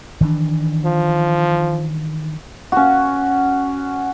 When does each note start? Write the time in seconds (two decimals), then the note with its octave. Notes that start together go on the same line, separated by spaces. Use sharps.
0.21 D#3 E3 D4
0.85 F3
2.72 C#4 F#4